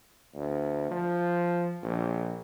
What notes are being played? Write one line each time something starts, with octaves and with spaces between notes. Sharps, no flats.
D2
F3
A#1